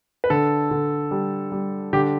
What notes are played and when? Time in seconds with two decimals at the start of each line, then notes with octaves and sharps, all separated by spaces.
0.24 B4
0.30 D3 A4
0.71 D3
1.11 G3
1.52 G3
1.93 D3 G4